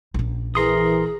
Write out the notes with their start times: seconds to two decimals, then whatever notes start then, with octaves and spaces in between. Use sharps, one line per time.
0.14 A#1 C#4
0.55 E3 G#4 A#4 C6 D#6